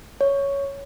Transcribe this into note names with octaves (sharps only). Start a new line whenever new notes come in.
C#5